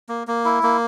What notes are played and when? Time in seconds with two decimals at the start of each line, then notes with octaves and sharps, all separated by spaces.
0.09 A#3
0.27 A#3
0.45 E4
0.63 A#3